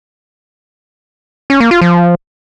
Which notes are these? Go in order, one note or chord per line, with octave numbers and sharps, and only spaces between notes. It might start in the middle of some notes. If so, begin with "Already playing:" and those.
C#4
A#3
F4
F3